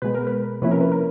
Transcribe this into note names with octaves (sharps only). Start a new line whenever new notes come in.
B2 G#3 B3 B4
A#4
B4
C3 F3 A#3 C#4 E4 B4
A#4
B4
A#4